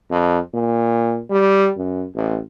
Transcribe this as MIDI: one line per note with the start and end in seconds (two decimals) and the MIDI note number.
0.11 0.39 41
0.54 1.21 46
1.30 1.70 55
1.77 2.06 42
2.15 2.40 33